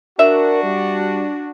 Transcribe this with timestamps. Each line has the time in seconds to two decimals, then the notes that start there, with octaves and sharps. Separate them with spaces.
0.19 D4 F#4 A#4 E5
0.64 G3